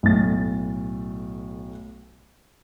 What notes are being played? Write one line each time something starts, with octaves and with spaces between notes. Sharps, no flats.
B1 A2 A6